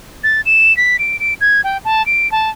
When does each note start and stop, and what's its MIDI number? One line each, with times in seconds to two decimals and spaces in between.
0.24 0.41 93
0.46 0.75 100
0.77 0.96 95
0.99 1.19 98
1.20 1.34 98
1.41 1.61 92
1.64 1.78 79
1.85 2.05 81
2.06 2.30 98
2.32 2.50 81